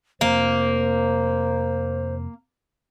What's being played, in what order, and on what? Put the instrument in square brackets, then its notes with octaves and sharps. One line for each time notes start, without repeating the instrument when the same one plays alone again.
[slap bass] F2 C3 F3 [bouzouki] A#3 [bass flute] C5